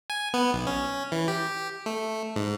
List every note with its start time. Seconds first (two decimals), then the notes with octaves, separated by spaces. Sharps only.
0.10 G#5
0.34 B3
0.53 B1
0.67 C#4
1.12 E3
1.28 G4
1.86 A3
2.36 G#2